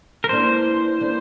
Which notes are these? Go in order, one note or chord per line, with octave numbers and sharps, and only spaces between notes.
A#4
E3 A#3 D4 C5
E3 A#3 D4